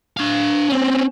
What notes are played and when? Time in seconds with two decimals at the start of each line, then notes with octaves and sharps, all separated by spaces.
0.17 D4 F5
0.68 C4 C#4